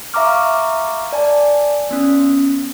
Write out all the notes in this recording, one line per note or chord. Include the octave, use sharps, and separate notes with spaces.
E5 F5 A#5 C#6 D6 F6
D5 G#5 A5
B3 C#4